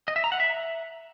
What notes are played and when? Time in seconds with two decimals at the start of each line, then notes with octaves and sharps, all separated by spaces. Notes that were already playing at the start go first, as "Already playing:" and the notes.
0.08 D#5
0.16 E5
0.24 A#5
0.32 F#5
0.40 E5